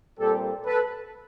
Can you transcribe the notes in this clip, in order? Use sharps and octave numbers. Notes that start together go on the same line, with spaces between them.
A#2 G3 C4 G4 A4
A4 B4